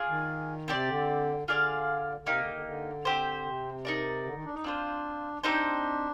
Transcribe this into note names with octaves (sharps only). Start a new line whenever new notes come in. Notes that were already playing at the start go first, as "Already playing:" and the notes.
Already playing: F4 G#4 D5
D#3
C3 C4 G4 D5
D3
D3 F4 G#4 D5 F5
D3
C3 A#3 D#4 G4
D3
D3
D3
C4 G4 C5
C3
D#4 A#4 D5
D3
D#3
D4
D#4
C4 D4 F4 C5
C4 D4 D#4 G4 C5